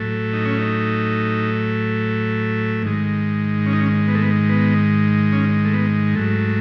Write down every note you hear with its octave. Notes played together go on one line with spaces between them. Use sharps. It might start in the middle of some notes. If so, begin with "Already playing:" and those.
Already playing: A2 F#3 A3
D#4
C#4
D#4
G#2 D#3 G#3
C#4
D#4
C#4
B3
A3
B3
B3
C#4
A3
B3
G#2 F#3 A3